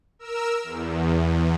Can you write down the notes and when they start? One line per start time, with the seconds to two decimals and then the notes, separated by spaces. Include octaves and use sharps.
0.19 A#4 E6
0.64 E2